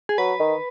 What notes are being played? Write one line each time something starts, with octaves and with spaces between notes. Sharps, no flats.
G#4
F#3 B4
D#3